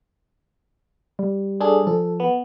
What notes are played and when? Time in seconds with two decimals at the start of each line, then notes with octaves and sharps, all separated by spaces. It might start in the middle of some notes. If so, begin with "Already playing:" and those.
1.19 G3
1.61 D4 G#4 A4
1.87 F3 A4
2.20 B3